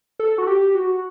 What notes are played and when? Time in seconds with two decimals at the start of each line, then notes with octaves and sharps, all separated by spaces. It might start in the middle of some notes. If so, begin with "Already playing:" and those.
0.19 A4
0.38 F#4
0.47 G4
0.75 F#4